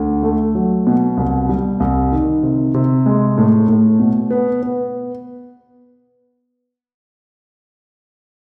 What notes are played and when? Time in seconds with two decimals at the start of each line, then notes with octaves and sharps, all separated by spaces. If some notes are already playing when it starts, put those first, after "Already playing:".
Already playing: D2
0.23 A3
0.55 F#3
0.87 B2
1.17 C2
1.49 G3
1.80 C2
2.12 D#3
2.43 C3
2.74 C3
3.06 G#3
3.38 A2
3.68 A2
3.99 B2
4.31 B3
4.63 B3